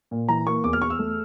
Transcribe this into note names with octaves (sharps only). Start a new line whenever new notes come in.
A#2
E3 A#5
A#3 C#6
E2 D6
F6
E2 C#6
E6
A3